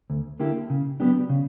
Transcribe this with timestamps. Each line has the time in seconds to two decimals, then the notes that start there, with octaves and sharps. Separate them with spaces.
0.10 D2
0.40 D3 A#3 E4 G4
0.70 C#3
1.00 F#3 B3 D4 G4
1.30 C#3